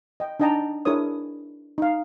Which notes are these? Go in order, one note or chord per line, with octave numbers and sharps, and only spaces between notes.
D#5 G5
D4 D#4 D#5 G5 A5 A#5
D4 E4 G#4 A#4 C#5 D#6
D#4 F5